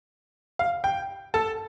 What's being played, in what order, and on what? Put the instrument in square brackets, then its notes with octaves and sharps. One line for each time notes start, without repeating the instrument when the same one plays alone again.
[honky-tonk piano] F5
G5
A4 A5